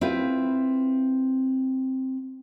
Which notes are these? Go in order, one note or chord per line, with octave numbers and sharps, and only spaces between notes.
C4 E4 F4 B4